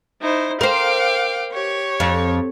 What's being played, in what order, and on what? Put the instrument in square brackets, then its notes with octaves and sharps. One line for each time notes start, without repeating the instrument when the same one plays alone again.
[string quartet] D#4 E4 C5
[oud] A#4 C5 [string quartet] F5 G5 D6
[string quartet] G4 C#5 C#6
[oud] F2